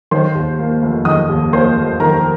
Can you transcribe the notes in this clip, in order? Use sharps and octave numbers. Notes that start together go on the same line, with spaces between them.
D#3 C5 C6
D#2
A#3
F1
D#3 D#5 D#6
D#2
A#3 C5 C6
F1
D#3 A#4 A#5